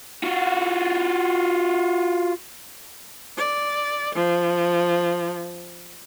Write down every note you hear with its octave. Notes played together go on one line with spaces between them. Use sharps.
F4 F#4
D5
F3